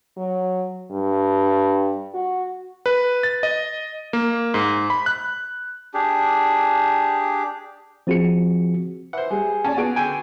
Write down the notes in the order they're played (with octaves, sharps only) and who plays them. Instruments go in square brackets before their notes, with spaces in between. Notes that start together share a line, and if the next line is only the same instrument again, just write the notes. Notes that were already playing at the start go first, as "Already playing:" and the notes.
[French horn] F#3
G2
F#4
[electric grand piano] B4
A6
D#5
A#3
G#2
B5
F#6
[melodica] D4 G4 G#4
[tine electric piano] F3 C4 F#4 G#4 C#7
[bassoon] E3 [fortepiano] C5 F#5
[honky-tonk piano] G3 [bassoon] G#4
[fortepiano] C#4 [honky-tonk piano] D5 G#5 A5
[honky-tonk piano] B3 G#4 D7 [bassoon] F#4
[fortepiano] D3 G5 G#5